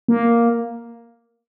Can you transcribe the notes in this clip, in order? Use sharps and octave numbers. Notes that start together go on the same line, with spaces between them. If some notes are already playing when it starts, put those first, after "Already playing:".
A#3